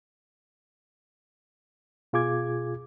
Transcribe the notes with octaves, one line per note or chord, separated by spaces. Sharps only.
B2 F4 G#4 D6 G#6